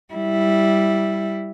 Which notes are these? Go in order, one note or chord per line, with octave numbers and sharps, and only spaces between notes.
G3 E4